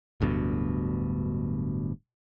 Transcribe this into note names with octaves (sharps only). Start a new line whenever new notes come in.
D1 D2 G2 B2